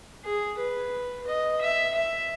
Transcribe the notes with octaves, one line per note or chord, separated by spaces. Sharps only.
G#4
B4
D#5
E5
E5